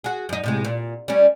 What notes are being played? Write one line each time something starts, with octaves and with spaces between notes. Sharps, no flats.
F#4 G#4
F#2 D#4
A2 C3 G#3
A#2
G3 C#4